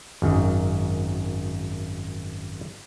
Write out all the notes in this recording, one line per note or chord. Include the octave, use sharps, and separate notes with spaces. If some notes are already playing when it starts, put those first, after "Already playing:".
G#1 F#2 D#3